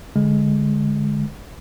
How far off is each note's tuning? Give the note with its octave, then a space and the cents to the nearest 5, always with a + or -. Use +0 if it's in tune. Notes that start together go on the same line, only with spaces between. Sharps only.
D3 -5 G#3 +0